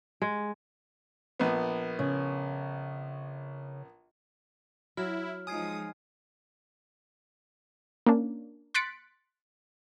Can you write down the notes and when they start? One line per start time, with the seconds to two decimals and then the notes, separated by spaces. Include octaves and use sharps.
0.22 G#3
1.40 A#1 B3
1.99 C#3
4.97 F#3 E4 F6
5.47 F3 G#3 D#4 G#5 D#6 G#6 C7
8.07 A#3 C#4 D4
8.74 C6 F#6 A6 B6 C#7 D7